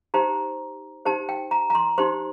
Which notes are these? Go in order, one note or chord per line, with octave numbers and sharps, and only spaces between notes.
D#4 G4 C5 A#5
D#4 G4 C5 A5
G5
A#5
A#5
C6
D#4 G4 C5 C6